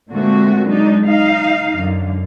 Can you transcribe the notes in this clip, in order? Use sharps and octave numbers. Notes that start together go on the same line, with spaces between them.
A#2 D3 G#3 A3 C4 F#4
F#3 G#3 D4 D#4
D#4 F5
F#2 D3